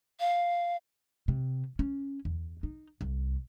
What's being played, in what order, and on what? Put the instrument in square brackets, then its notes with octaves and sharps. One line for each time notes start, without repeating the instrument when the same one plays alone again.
[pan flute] F5
[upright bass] C3
C#4
E2
D#4
C2